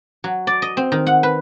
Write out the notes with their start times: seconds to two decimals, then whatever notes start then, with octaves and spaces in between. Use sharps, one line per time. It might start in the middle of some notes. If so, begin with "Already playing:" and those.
0.24 F#3
0.47 D5
0.62 D#5
0.77 C4
0.92 D#3
1.07 F#5
1.23 B4